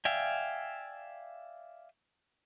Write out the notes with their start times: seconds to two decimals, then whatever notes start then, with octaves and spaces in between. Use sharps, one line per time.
0.05 D5 E5 F5 G5 G#5